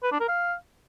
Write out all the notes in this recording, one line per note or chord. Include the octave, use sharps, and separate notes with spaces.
B4
D4
A#4
F5